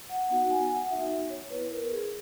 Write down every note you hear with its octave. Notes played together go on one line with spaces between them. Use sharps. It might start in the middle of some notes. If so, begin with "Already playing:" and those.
F#5
B3 D#4 F#4 F#5
G#5
G#5
F#5
B3 D#4 F#4 E5
C#5
B3 E4 B4
A#4
G#4